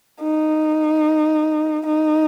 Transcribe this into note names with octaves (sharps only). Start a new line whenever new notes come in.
D#4
D#4